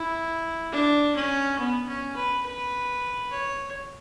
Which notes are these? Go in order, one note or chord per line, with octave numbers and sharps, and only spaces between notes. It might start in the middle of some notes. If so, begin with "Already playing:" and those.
Already playing: E4
D4
C#4
B3
C#4
B4
B4
C#5